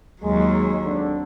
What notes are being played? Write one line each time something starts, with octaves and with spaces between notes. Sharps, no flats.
D#2 F#3 G#3
D3 C4 D4